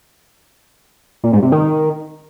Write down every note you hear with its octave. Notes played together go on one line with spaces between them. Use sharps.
A#2
G#2
C3
D#3